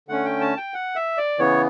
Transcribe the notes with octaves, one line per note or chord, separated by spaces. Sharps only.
D3 A3 C#4 F#5
G5
A5
G5
F#5
E5
D5
C#3 E3 B3 C#5